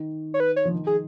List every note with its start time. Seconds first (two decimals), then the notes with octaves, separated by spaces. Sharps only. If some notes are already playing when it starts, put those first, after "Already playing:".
Already playing: D#3
0.34 C#5
0.40 B4
0.56 C#5
0.65 F3
0.72 D#3
0.87 G#4